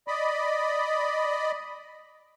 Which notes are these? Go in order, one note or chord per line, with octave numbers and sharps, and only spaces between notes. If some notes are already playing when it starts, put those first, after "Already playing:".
D5 D#5 B5